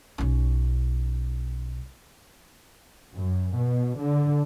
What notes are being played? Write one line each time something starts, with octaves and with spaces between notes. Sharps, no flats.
B1 C#4
F#2
B2
D3